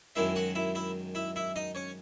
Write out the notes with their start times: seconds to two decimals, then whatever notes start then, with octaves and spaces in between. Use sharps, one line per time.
0.15 F#2 D#3 G#3 E4 E5
0.36 F#4 F#5
0.55 E4 E5
0.75 E4 E5
1.15 E4 E5
1.36 E4 E5
1.56 D#4 D#5
1.75 C#4 C#5